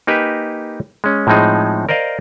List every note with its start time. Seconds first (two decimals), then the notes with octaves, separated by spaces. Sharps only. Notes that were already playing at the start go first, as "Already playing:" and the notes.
0.07 A#3 D#4 G4 B4 G#5
1.04 G#3 C#4
1.27 A2 F3 G#3 C4 D#4 G#4
1.89 A#4 C5 D5 D#5 F5